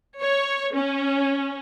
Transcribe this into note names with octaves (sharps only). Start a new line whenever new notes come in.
C#5
C#4